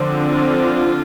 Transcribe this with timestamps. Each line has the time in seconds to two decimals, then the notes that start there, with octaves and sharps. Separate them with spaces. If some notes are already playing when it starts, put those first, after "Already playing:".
Already playing: D3 F3 C4
0.28 F4